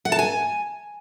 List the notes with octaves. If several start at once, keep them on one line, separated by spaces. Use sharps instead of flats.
F#5
A5
G#5